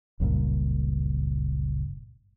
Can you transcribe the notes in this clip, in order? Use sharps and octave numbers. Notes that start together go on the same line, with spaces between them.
F#1 C#2 G2 A#2